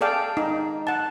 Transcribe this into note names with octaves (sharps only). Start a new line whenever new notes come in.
G#4 A4 D5 F5 G5
D#4
F#5 A5